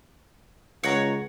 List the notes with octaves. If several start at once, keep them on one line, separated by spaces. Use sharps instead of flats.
C#2 C#5 F#5 A#5